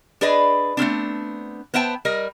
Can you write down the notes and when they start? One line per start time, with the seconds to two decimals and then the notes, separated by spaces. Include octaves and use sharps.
0.21 D4 G#4 B4 D5 D#5
0.77 A3 B3 C4 D4
1.74 B3 C5 E5 G5 A5
2.05 G3 A#4 D#5